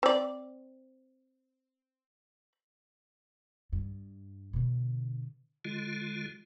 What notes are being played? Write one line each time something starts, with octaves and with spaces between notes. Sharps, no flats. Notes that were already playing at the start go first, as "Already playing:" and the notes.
C4 D5
G2
B2 D3
D3 G#3 F4